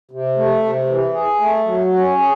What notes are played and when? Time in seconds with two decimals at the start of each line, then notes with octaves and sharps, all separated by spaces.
0.11 C3
0.37 A3
0.63 C3
0.88 E3
1.14 G#4
1.40 A3
1.66 F#3
1.93 C#4
2.18 G#4